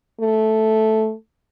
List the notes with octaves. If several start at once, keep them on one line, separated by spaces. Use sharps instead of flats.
A3